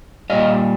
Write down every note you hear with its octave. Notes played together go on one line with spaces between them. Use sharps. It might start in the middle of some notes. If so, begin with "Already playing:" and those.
A#2 G3 D#5 F5